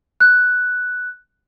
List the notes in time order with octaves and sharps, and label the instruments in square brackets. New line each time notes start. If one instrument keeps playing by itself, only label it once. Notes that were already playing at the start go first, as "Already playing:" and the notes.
[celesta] F#6